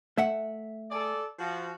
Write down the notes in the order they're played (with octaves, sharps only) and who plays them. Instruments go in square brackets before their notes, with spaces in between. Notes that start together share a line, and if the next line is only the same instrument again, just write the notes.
[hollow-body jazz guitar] A3 E5 F#5
[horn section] G#4 A4 D5
F3 F#4